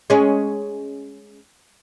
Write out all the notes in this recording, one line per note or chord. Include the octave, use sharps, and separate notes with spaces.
G#3 C#4